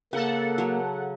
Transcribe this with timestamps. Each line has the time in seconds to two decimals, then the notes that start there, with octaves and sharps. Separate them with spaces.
0.13 C#3 A#3 A4 F#5
0.58 F#3 C#5